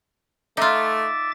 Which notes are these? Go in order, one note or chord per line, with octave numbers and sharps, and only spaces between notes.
A3 D#4 F4 E5 D6 A6